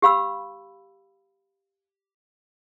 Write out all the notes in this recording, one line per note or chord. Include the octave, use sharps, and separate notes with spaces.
G4 F5 B5 E6